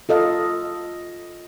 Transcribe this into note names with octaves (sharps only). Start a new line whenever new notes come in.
F4 A4 D#5 F5